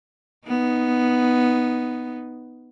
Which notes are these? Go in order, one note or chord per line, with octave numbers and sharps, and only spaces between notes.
B3 D#4